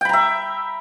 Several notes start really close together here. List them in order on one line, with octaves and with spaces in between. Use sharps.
G5 B5 A#5 E5